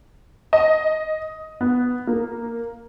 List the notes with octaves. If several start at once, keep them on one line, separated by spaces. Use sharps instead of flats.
D#5
B3
A#3